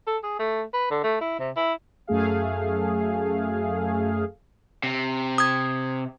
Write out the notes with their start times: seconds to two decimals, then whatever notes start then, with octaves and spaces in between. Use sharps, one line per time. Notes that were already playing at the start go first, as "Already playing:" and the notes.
0.07 A4
0.23 G#4
0.39 A3
0.73 B4
0.90 D3
1.04 A3
1.21 E4
1.39 C3
1.56 E4
2.07 F#2 A3 G#4 F5
4.83 C3
5.38 D#6 G#6